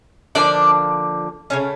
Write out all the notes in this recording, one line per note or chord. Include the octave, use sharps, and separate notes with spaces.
D3 F3 A#3 D4 D5
C#3 F3 A3 C#4 C#5